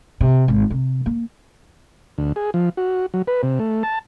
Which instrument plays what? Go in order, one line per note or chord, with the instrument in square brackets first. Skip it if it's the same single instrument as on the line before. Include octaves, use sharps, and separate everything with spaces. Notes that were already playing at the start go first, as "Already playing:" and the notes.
[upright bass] C3
G#1
C3
A#3
[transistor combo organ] D2
G#4
F3
F#4
F#3
B4
C3
A3
A5